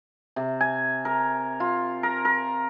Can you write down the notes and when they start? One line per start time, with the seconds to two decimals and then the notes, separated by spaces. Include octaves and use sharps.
0.36 C3
0.61 G#5
1.05 A#4
1.60 F4
2.03 A#4
2.25 A#4